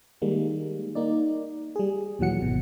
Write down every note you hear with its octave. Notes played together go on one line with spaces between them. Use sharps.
D#3 G3 G#3 A#3
A#3 D#4 D5
G3 G#4
D#2 A#2 E3 F#3 F#5 C#7
G#1 B2